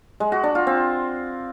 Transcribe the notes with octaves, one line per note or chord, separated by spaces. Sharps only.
G#3
F#4
D4
F4
C4